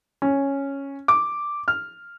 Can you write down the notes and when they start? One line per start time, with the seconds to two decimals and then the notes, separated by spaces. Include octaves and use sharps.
0.22 C#4
1.08 D6
1.68 F6